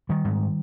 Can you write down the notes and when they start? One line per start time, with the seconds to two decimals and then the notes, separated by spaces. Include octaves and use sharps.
0.09 D#3 G3
0.25 G#2